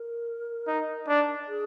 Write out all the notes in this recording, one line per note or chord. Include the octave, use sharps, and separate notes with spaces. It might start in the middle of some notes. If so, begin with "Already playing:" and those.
Already playing: A#4
D#4
D4
G#4